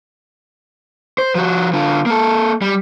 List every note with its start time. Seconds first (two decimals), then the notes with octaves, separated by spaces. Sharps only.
1.18 C5
1.35 F3 F#4
1.73 D3 F4
2.06 A#3 A4
2.62 G3